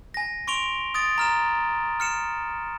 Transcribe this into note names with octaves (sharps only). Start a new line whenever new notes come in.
G#5 A#6
C6 C#6 D7 F7 G7
D#6 A6 D7
A#5 F6 E7
F6 C#7 E7